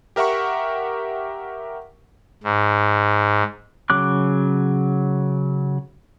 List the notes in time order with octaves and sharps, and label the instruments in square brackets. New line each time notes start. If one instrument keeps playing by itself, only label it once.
[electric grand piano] G4 A#4 E5 F#5 C#6
[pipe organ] G#2
[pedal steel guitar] C#3 F#3 D6 F#6